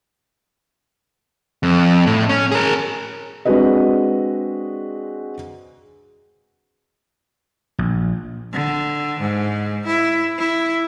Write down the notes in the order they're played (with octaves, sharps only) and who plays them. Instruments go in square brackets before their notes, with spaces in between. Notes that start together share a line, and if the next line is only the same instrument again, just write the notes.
[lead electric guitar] F2
A2
C#4
G#4 A#4
[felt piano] G#3 C4 D4 F#4 B4 D#5
[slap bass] A#1
[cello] D3
G#2
E4
E4